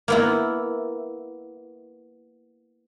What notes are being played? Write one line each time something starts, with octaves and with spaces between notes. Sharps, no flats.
A#3 B3 E4